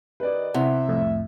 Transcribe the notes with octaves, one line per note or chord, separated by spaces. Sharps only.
D#3 G4 B4 D5 D#5
C3 E4 E5 F#5
C2 F2 A2